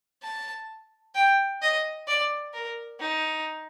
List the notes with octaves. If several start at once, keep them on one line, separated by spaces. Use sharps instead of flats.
A5
G5
D#5
D5
A#4
D#4